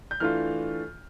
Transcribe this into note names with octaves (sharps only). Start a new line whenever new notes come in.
G6
E3 A3 D4 F4 F6